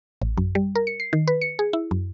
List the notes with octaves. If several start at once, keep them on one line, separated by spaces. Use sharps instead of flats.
A1
F#2
G3
A#4
C#7
C7
D#3
B4
C#7
G#4
E4
F#2